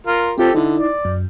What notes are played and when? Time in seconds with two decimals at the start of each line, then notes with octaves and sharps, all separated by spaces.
0.07 F4 A#4
0.38 C4 F4 G4 A4 C5
0.54 D3 D#4 E4
0.77 D5
1.05 F#2